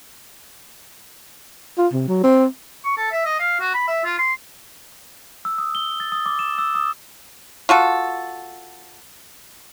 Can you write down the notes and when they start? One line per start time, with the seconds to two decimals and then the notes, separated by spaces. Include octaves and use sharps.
1.78 F4
1.93 C3
2.08 F#3
2.23 C4
2.85 C#6
2.97 A4
3.12 E5
3.25 D#5
3.39 F5
3.60 F#4
3.74 B5
3.88 E5
4.04 F4
4.18 C6
5.45 E6
5.58 D#6
5.75 G7
6.00 A6
6.12 D#6
6.26 D6
6.39 E7
6.58 E6
6.75 D#6
7.69 F4 F#4 A4